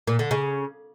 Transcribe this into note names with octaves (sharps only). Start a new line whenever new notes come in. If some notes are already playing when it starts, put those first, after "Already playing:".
A#2
D3
C#3